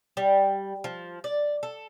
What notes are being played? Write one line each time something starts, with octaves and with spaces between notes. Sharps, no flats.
G3
F3
D5
A4